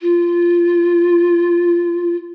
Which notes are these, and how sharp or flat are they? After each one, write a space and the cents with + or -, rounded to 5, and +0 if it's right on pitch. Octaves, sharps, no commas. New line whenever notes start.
F4 -15